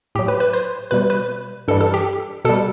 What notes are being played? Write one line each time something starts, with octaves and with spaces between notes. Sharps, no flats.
A2 F#3 G4
B4
B4
C5
B2 G3 B4
B4
G2 E3 G3 A4
A4
G4
B2 G3 A4